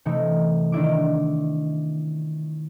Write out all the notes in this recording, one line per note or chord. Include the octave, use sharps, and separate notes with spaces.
C3 E3 A3 D#4 E4
D#3 D4 E4 D6